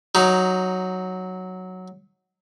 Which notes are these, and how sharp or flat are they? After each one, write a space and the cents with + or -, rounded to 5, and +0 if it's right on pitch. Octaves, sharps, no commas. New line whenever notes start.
F#3 +0 D#4 +0